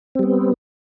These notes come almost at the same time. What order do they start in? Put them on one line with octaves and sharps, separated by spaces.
C4 G3 B3